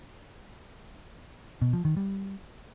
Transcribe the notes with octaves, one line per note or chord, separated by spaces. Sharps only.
B2
F3
D#3
G3